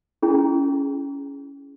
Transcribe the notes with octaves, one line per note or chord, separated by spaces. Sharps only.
C#4 E4 G#4